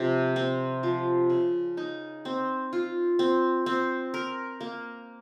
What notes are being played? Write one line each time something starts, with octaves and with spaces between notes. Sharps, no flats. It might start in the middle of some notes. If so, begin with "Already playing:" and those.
Already playing: C3 F3
C4
F3
C#3
D#4
C4
F4
C4
C4
A#4
A#3